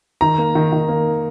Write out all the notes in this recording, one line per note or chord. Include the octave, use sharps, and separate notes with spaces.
D#3 A#5
A#3
D#3
D#3
A#3